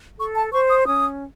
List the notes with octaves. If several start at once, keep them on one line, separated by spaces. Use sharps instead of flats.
A4 C#6
A5
C5 C#6
D#6
C#4 D#6